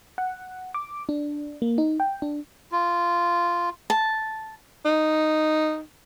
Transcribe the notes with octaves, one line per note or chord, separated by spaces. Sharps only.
F#5
D6
D4
A#3
D#4
G5
D4
F4
A5
D#4